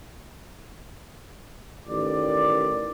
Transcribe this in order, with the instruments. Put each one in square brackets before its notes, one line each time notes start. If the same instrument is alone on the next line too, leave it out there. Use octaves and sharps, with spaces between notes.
[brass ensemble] A1 D#3 D5